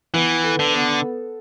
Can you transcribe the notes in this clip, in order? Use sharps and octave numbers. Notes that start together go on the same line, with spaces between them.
E3 B3
A4
D3
B3